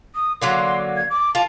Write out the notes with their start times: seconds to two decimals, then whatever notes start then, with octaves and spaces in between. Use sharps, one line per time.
0.15 D#6
0.42 D3 F#3 A#3 C6
0.97 G#6
1.10 D6
1.35 F4 A#4 A5